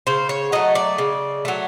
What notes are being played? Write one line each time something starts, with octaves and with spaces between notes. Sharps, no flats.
C#3 C5
C#5
F#3 A3 D#5
D5
C#3
F#3 A3